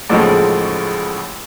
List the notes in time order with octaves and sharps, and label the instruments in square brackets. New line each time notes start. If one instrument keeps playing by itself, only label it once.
[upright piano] A1 D#2 A2 C#3 F3 G#3